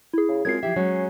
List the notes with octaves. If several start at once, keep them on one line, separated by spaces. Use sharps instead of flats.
E4 G#4
C#3
F#2 G#3 C4 F4 G#6 C7
F3 E4 G4 E5
F#3 G#3 C#4